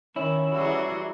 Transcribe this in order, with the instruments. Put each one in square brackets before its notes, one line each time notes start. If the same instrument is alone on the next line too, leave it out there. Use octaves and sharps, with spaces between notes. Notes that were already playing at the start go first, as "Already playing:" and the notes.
[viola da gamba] D#3 [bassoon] C#4 [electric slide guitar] E4
[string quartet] E3 F#3 G3 [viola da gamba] F#4 G#4